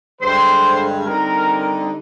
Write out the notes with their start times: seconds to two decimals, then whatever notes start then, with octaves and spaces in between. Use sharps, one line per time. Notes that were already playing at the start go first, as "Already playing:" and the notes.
0.21 G2 D3 G#3 C5
1.06 D3 G3 C4 D#4 A#4